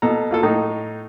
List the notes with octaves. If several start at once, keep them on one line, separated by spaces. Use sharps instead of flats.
B2 A4 A#5
A#3 F4 A4
A2 D#4